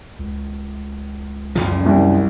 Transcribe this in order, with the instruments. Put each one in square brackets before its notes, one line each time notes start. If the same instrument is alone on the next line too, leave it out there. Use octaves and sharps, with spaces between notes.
[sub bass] C#2
[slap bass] F#2 C#3 F3
[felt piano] C2